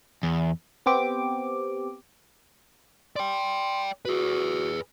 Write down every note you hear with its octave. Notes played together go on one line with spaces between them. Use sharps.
E2
B3 C4 G4 D6
D5 G5 C6
F#4 G#4 B4